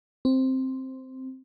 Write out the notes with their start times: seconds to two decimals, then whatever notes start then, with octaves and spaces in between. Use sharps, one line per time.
0.25 C4